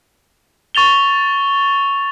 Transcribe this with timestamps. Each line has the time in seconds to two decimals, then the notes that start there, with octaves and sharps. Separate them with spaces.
0.75 C#6 A6 F7 G7